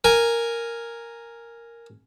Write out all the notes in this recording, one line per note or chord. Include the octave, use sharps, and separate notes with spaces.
A#4 G#5